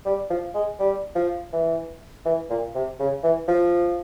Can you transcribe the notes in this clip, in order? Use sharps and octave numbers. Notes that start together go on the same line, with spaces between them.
G3
F3
G#3
G3
F3
E3
E3
A#2
C3
C#3
E3
F3